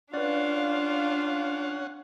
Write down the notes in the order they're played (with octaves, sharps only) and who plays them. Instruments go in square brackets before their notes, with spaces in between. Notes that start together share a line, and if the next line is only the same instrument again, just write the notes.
[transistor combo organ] C#4 F#5 [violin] D4 F5 [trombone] F4 [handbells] B4 D5